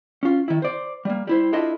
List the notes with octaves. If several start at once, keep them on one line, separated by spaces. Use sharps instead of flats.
C#4 F4
D#3 E4
C5 D5
G3 A#3
G3 E4 C5
D4 E4 F4 A4 D#5 E5